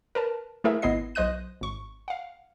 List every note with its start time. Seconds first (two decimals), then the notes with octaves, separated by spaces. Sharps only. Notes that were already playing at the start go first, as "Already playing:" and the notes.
0.15 A#4 B4 A5
0.64 A3 E4 G#4 A#4 B4 E5
0.82 G#1 B3 E4 D#5 C7
1.15 B1 C5 D#5 D#6 F#6 D#7
1.61 G#1 C#6
2.08 F5 F#5